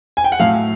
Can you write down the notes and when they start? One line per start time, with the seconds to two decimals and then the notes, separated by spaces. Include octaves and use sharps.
0.17 G#5
0.24 G5
0.32 F#5
0.40 A2 F#3 A3 F5